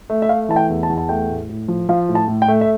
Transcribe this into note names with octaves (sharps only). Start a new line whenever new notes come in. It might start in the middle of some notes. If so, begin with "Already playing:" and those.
A3
E5
A3 F5
E3 A5
G5
E2
A5
E2
A5
A3 G5
A2
A2
F3
F3 F5
A2
A5
A2
G5
A3
E5